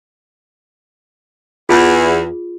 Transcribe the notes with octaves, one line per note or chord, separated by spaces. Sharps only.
E2 F4 G#4